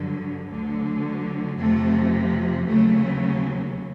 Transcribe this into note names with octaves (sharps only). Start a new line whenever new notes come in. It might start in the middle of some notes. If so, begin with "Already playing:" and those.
Already playing: G2 D3 F#3
D2 D3 F#3
F2 C3 F3 A3
D#2 C#3 F#3 A3